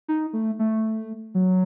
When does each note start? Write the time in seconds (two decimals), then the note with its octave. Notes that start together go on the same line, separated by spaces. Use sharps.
0.08 D#4
0.33 A3
0.59 A3
1.35 F#3